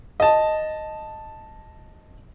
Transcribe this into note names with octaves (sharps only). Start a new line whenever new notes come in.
D#5 A5